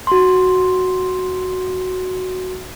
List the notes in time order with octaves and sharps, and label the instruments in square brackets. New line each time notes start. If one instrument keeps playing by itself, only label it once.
[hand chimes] F#4 C6